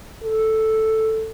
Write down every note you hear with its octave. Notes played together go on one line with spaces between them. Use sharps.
A4